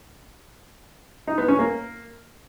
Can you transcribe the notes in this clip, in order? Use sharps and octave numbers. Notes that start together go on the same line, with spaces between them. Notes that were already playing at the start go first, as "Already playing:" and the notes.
D#4
B3
C#4
A#3